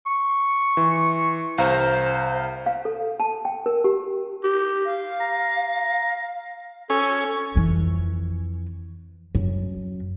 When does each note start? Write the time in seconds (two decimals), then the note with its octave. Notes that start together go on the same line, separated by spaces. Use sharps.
0.06 C#6
0.77 E3
1.58 C2 C5 F5 A#5
2.66 F5
2.85 A4
3.20 A5
3.45 G5
3.66 A#4
3.84 G4
4.44 G4
4.85 F5
5.20 A#5
6.90 C#4 A4 G#5
7.56 F2 E3
9.35 F#2